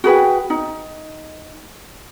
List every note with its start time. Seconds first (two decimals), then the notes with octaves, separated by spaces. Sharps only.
0.04 F#4 G#4 B4 G5
0.50 D#4